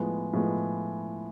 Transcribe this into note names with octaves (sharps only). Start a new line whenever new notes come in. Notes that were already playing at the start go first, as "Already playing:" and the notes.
Already playing: A2 F3 G#3 B3
A2 F3 G#3 B3